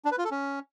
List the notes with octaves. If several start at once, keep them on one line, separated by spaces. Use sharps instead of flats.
D4
B4
F4
A4
C#4